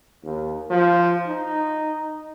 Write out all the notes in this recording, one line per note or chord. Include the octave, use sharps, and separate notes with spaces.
D#2
F3
D#4